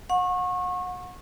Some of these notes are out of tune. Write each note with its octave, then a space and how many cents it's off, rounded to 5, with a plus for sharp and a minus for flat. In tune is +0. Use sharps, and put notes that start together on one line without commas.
F#5 -35 C#6 -30